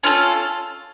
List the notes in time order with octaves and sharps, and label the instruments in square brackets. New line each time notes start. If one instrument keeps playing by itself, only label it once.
[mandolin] C#4 F4 A4